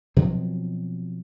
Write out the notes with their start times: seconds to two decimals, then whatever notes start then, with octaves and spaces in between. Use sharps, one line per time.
0.16 B2 F3 F#3 C4